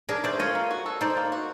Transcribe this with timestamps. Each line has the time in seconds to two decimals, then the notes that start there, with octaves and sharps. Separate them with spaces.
0.09 D4 G#4 A#4
0.24 A3 C5 D5
0.39 F4 C#5 D#5
0.55 A#3
0.71 F#4
0.86 A4
1.01 D#4 C5 D5
1.17 A#3
1.32 F#4